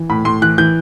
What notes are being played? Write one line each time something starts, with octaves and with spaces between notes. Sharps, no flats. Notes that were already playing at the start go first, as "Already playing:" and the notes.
Already playing: E3
A2 B5
A2 C6
E3 F#6
E3 G6